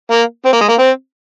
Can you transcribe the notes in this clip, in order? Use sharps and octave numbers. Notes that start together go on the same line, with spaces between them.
A#3
C4
A#3
G#3
A#3
C4